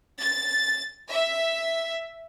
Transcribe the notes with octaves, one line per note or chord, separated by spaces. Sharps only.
A6
E5